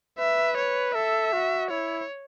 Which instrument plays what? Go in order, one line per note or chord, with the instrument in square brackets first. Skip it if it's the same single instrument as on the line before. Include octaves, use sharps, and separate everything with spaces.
[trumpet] B4 [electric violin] E5
[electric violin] C#5
[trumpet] A4 [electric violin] E5
[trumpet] F#4
[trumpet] E4 [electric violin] C#5